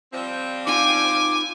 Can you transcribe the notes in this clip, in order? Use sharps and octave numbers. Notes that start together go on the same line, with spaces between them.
F3 G3 C4
D#4 F4 F5 G#5 D6